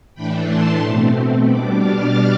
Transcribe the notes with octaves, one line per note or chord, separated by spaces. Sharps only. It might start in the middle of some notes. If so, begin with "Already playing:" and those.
A2 E3 A3 D4 G5 B5
A5 C6
B2 A3 C4
B2 G3 D4 B5 D6
F6 A6